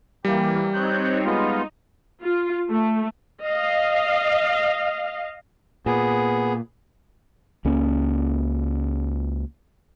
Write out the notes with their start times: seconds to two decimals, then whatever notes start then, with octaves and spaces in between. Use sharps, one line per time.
0.25 E3 G3 A#3 G4
0.73 C4 D#4 C#5 F#6 G6
1.25 G#3 B3 D#4 F4
2.22 F4
2.69 A3
3.41 D#5 F5
5.86 A#2 B3 G#4
7.65 C#2 A#3 C#4